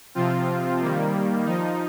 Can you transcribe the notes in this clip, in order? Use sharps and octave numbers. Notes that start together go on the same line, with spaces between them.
C3 F3 C4 F4
D#3 G3 A#3
F3 D#4